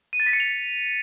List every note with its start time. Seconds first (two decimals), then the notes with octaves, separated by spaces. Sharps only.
0.13 D#7
0.20 A6
0.26 B6
0.33 C#7
0.40 F7